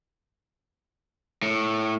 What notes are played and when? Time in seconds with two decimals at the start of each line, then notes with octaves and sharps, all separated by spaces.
1.42 A2